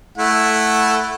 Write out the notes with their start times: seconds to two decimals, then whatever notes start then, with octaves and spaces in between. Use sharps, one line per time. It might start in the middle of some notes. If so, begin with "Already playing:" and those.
0.18 A3 E4 F#5